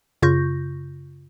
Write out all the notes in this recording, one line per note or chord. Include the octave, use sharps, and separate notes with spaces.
F#2 C#3 F4 C#6 G6 A#6